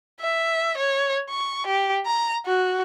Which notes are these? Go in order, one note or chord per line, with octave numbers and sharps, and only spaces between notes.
E5
C#5
C#6
G4
A#5
F#4